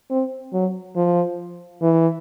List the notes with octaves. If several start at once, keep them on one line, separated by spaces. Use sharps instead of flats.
C4
F#3
F3
E3